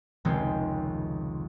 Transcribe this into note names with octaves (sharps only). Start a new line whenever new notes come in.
F1 C#2 D#3 G#3 C4 G5